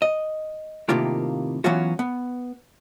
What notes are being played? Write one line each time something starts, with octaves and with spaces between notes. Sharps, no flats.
D#5
A2 C3 D#3 A#3 F4 G4
E3 F#3 B3 C#4 F4 F#4
B3